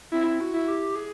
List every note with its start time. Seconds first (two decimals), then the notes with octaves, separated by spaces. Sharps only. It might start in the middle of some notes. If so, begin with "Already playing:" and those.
0.12 C4 E4
0.40 F#4
0.54 E4
0.68 G4
0.96 G#4